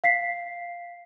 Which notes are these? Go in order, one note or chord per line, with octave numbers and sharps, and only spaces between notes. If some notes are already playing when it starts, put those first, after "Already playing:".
F5 B6 C7